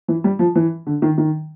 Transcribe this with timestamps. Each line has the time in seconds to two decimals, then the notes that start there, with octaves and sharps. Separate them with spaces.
0.08 E3
0.24 G3
0.39 F3
0.55 E3
0.87 D3
1.02 D#3
1.18 D#3